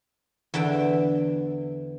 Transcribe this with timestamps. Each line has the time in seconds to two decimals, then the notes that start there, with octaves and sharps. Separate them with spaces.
0.54 E2 D3 E5 G5